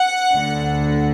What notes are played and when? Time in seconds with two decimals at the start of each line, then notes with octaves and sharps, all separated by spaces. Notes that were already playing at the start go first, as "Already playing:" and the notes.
Already playing: F#5
0.33 D2 D3